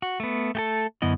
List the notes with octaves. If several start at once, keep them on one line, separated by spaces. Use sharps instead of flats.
F#4
A3 B3
A3 G4 A4
F#2 D3 B3 E4 D#5